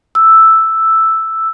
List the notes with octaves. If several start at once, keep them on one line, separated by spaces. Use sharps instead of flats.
E6